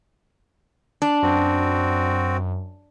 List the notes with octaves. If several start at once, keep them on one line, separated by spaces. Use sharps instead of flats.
D4
F#2 C4 F#4